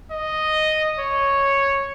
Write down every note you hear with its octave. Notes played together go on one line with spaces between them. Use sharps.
D#5
C#5